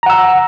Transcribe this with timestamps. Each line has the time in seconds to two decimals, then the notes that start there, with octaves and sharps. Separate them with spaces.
0.03 A#5
0.06 F#5
0.10 E6